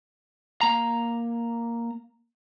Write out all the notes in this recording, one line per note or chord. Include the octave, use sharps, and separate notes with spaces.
A#3 A#5